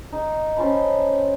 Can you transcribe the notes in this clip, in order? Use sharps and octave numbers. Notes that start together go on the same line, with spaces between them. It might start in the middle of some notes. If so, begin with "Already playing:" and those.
D#4
C#4 C5 A5 B5